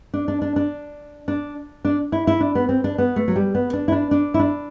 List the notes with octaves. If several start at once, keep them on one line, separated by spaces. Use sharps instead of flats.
D4
D4
D4
D4
D4
D4
E4
E4
D4
B3
C4
D4
B3
A3
F#3
G3
B3
D4
E4
D4
D4
E4
D4